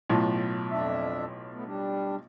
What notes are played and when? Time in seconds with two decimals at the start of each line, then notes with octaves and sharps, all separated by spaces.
0.09 B1 A2 F4
0.71 F2 D4 E5
1.54 A3 B3
1.66 G3 D4